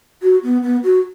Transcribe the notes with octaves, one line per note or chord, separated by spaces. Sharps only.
F#4
B3
B3
F#4